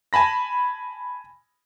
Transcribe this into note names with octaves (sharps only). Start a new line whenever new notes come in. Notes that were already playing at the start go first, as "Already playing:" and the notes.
G#5 A5 B5 A#6